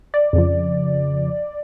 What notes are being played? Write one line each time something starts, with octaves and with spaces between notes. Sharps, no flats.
D5
F2 C#3 F3